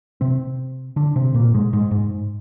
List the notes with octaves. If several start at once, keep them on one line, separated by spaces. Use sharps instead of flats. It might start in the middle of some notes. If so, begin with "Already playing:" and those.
C3 C4
D3 D4
C3 C4
A#2 A#3
G#2 G#3
G#2 G#3
G#2 G#3